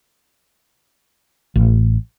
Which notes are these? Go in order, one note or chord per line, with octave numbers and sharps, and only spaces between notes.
A1